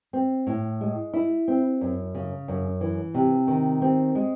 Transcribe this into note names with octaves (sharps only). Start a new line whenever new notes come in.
C4
A2
G#3
E4
C4
F#2
C#3
F#2
E3
C3
D#3
C4
G#3